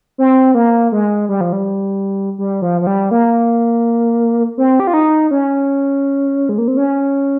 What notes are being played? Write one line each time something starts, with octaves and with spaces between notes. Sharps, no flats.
C4
A#3
G#3
G3
F3
G3
G3
F3
F3
G3
A#3
C4
G4
F4
D#4
C#4
G#3
A#3
C4
C#4